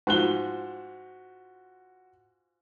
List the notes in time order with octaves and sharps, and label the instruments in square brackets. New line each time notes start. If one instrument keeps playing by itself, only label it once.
[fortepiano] G#2 F3 [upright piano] F#4 F#6 G7